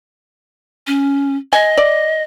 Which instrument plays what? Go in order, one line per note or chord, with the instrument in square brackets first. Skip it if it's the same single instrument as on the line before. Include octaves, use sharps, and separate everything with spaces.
[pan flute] C#4
[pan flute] D#5 [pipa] G#5
[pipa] D5